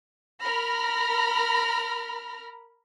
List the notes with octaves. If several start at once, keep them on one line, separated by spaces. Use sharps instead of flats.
A#4 A#5 B5 F6 A#6